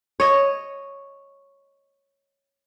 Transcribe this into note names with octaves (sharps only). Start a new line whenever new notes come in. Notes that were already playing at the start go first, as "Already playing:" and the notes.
C#5 D#5